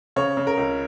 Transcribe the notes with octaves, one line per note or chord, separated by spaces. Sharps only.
C#3 C#5
C#3
A#4
C#2